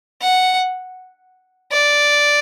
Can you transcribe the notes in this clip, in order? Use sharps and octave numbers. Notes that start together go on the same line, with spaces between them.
F#5
D5